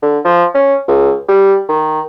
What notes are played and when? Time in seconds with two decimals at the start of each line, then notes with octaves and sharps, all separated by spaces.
0.02 D3
0.25 F3
0.55 C#4
0.88 C#2
1.28 G3
1.69 D#3